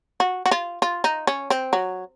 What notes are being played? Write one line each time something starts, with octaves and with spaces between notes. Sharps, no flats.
F#4
F#4
F4
F4
D#4
C#4
C4
F#3